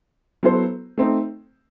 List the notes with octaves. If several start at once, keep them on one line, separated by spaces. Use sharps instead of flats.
F#3 B3 E4 A4 C5
A3 C4 D#4